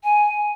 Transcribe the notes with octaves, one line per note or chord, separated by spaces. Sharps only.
G#5